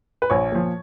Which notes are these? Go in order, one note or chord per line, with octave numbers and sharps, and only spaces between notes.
B4
A#1 C#5
A#2 F3